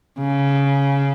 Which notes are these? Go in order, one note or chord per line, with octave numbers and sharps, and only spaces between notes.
C#3